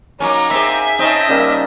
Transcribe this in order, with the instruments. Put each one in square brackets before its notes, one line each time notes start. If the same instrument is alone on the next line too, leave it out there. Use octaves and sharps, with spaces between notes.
[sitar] F#3 A#3 C#4 [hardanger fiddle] D#4
[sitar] A#3 C4 G#4 [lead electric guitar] E5
[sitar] C4 C#4 [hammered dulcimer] D#4 [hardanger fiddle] D#5 A5
[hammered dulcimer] C#3 G3 A#3